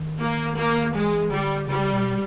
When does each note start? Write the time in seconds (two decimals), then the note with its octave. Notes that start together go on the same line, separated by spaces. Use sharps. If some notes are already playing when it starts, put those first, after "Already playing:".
Already playing: D#3
0.21 A#3
0.58 A#3
0.95 E3 G#3
1.31 D3 G3
1.68 C#3 G3
1.92 B2